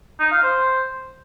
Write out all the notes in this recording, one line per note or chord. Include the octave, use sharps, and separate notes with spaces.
D#4
F5
C5